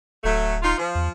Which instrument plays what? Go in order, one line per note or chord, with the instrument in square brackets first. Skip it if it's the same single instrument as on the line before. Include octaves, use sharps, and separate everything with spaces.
[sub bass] D1 [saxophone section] F#3 A3
[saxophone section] D#4 F4
F3
[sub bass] E2